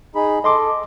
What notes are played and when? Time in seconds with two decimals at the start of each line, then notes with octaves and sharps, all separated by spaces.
0.15 D#4 G#4 B5
0.44 A4 D#5 C6 D6